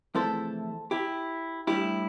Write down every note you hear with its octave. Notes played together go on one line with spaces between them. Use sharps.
E2 C3 F3 A3 E4 A4 C5
E4 G4
A2 G3 D4 E4 G4